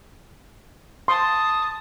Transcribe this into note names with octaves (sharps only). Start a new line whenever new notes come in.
A5 C6 D#6